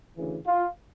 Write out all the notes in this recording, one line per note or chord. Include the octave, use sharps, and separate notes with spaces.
D2 C#3 E3
F4